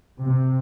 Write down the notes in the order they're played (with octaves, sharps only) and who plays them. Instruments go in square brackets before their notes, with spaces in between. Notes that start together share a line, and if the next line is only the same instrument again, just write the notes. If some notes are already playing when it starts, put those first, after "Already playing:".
[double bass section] C3